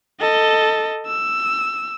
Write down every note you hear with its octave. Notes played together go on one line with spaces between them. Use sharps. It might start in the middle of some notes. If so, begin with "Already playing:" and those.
A4 D#5
E6